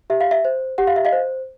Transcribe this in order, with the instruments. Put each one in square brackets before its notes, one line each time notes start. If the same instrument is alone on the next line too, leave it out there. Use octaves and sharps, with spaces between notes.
[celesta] G4 E5
F5
E5
C5
G4 F#5
F5
E5
D#5 F5
C5